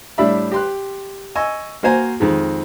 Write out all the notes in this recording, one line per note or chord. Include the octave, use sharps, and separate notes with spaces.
A2 G3 D4 D5 E5 B5
G4 C6 F#6
D#5 G#5 C#6 E6
A#3 F#4 C5 G#5 A#5
F2 D#3 G#3